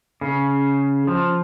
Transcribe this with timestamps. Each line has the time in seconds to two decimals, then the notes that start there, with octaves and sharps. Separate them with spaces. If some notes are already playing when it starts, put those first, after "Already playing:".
0.21 C#3
1.07 F3